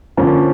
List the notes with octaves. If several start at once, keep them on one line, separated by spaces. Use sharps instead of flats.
D3 F3 A#3 C#4